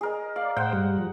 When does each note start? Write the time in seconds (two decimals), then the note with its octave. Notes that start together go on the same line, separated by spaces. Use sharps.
0.01 G#4 A#4 D#5
0.36 D5 F5
0.57 A2 C5 F#5 G5
0.73 G2 G3
0.98 F3